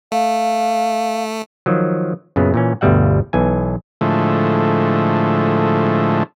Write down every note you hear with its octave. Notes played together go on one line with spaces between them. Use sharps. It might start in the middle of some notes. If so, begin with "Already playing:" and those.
A3 F5
D#3 F3 F#3
F#2 A#2 C#3 B3
A#2 E3 C#4
G1 D2 B2 G3 E5 F#5
B1 E3 G#5
A2 D3 F3 G#3 A3